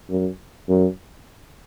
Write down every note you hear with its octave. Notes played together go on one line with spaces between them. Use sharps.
F#2
F#2